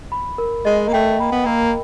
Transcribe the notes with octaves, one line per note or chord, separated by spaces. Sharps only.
B5
A#4
G#3 D#5
A#3
A3 G5
A#3 B5
B3
A#3 A#4